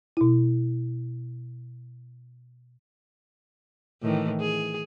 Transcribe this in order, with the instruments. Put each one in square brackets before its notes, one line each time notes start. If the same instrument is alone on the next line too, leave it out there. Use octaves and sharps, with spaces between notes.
[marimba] B2 E4
[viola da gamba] A2 D#3 E3
G#4